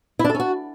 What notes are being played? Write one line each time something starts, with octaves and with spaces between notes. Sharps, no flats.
E4
D4
A4
C#4
F#4